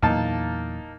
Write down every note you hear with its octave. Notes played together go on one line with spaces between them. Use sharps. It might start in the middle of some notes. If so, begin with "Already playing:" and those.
E2 A#2 F#3 A#3 D#4 A5